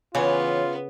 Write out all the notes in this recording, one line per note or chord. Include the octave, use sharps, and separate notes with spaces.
C#3 E3 B3 F4 C#5